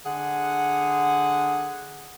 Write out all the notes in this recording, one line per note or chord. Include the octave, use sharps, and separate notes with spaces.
D3 G#4 F#5